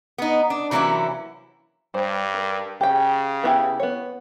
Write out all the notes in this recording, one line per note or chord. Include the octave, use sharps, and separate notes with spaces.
B3 D#4
D4
C3 E3 F#3 A#3 C#4 E4
G2 G3 C5
A#4
C#3 G4 G5
B3 E4 G4
B3 C#5